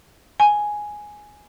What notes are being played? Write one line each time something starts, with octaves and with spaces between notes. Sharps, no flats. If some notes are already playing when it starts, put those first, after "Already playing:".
G#5